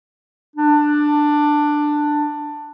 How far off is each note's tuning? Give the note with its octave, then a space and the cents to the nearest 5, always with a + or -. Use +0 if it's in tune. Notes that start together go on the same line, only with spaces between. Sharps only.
D4 +10